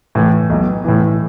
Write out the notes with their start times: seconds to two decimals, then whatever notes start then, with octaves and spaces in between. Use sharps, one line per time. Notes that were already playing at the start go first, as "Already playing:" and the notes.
0.15 A2 E3
0.50 B1
0.84 A2 E3